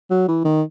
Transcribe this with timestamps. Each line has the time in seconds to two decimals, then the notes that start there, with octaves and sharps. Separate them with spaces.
0.10 F#3
0.28 E3
0.44 D#3